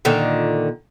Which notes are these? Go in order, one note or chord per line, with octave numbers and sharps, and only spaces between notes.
A#2 D3 D#3